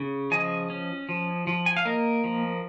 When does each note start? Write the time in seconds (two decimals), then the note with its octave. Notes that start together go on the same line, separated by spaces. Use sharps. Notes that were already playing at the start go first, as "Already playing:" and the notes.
Already playing: C#3
0.31 F3 D#5 G#5
0.70 C#4
1.09 F3
1.47 F3
1.66 G#5
1.77 F5
1.85 A#3 A#4 D#5
2.24 F3